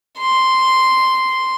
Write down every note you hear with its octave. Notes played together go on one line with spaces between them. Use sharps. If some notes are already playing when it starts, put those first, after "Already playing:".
C6